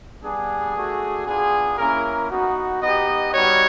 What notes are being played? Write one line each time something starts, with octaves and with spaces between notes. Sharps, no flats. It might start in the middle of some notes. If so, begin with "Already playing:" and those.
G3 B3 D4 G#4
A3 D4 F#4
B3 D4 F4 G#4
A#3 C#4 E4 A#4
B3 D#4 F#4
B3 D#4 G4 D#5
G3 B3 D#4 F#4 C#5